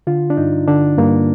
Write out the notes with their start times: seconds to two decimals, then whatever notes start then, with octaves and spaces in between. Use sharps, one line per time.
0.07 D3 F4
0.30 D4
0.37 G2 D#4
0.68 D3 D4
0.98 G2 A#3